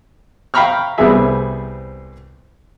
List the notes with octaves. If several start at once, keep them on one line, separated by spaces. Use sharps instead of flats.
F5 G5 A#5 B5 C#6 F6
C2 G3 B3 C4 G#4 E5